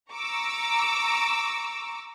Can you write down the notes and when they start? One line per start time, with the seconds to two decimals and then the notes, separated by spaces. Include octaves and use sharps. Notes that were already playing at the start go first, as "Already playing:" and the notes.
0.11 A#5 C#6 D6 E6